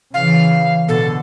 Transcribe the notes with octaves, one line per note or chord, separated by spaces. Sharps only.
C#3 E3 F5
B2 D3 A4